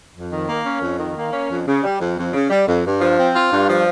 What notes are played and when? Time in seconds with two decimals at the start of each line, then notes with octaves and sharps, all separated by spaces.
0.14 F2
0.31 D#3
0.48 A#3
0.65 C#4
0.81 F2
0.98 D#3
1.15 A#3
1.32 C#4
1.49 F2
1.66 C#3
1.83 G3
2.00 F2
2.17 F2
2.33 C#3
2.50 G3
2.67 F2
2.84 G2
3.00 F3
3.17 C4
3.35 F4
3.51 G2
3.68 F3